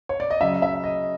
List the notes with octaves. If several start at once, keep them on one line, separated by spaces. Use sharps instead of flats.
C#5
D5
D#5
C#3 F#3 E5
E5
D#5